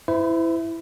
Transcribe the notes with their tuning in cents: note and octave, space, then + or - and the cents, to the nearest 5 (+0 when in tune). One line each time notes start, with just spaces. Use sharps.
E4 +0 C5 -45 E5 +0